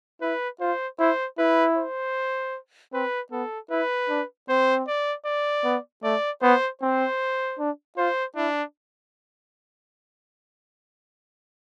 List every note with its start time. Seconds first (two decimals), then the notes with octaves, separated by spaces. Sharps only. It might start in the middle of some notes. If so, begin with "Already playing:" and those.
0.21 E4 B4
0.60 F4 C5
0.99 E4 C5
1.38 E4 B4
1.77 C5
2.93 C4 B4
3.32 B3 A4
3.70 E4 B4
4.09 D4
4.49 C4 C5
4.87 D5
5.26 D5
5.64 B3
6.04 A3 D5
6.42 B3 C5
6.81 C4 C5
7.59 D4
7.97 F4 C5
8.36 D4 E4